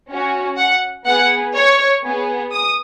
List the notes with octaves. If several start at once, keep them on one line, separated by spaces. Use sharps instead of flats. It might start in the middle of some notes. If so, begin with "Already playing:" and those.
C#4 F#4
F#5
B3 G#4 F#5
C#5
B3 G#4
D#6